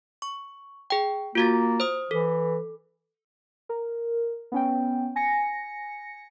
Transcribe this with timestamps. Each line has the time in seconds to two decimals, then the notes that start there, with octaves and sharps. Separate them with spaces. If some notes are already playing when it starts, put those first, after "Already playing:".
0.22 C#6
0.90 G#4 G5
1.35 A#3 F4 F#4 A6
1.80 C5 D#6
2.11 E3 A4
3.69 A#4
4.52 B3 C#4 G5
5.16 G#5 A#6 C#7